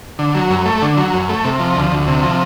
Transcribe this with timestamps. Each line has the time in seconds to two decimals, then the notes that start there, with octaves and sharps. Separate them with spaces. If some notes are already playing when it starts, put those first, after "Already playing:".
0.19 D3
0.35 F#3
0.50 F#2
0.66 A3
0.82 D3
0.97 F#3
1.13 F#2
1.29 A3
1.45 C3
1.60 F3
1.76 D2
1.91 D2
2.08 C3
2.23 F3